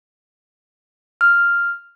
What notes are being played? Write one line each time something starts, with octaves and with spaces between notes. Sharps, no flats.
F6